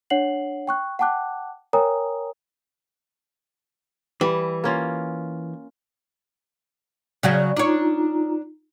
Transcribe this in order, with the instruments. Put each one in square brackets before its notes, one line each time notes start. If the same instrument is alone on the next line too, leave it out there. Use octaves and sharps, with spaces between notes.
[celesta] D4 C#5 F#5 C7 F#7
G5 C#6 F#6
F#5 G5 A5 D6 F#6
A#4 C#5 G5 G#5 A#5 D#6
[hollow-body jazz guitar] E3 [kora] G3
[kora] A#3 C#4 F4
[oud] C#3 F#3 F#4 [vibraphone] D5
[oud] D4 C#5 [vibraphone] D#4 F4 A#5